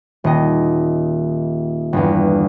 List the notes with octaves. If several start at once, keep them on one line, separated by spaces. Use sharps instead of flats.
D#1 D#5
G1 E2